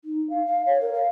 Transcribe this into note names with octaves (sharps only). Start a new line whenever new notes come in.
D#4
F5
F5
C#5
A#4
F5